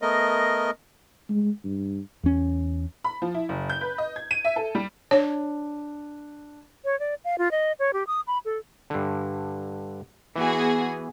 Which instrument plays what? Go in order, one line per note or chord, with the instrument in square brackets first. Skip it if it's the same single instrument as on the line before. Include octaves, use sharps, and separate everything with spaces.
[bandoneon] A3 B3 A#4 D#5
[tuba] G#3
G2
[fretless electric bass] E2 C#4
[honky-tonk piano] B5
F3
E4
F#1
G6
B4
D#5
G#6
D#7
E5
A4
G3
[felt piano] D4 [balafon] C#5
[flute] C#5
D5
F5
F4
D#5
C#5
G4
D#6
B5
A4
[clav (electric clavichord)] G2 D3
[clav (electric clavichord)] E3 [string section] B3 F#4 G#4